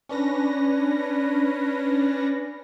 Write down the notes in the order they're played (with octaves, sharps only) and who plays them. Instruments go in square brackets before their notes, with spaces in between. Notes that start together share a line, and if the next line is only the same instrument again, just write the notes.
[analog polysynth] C#4 D4 B4 A#6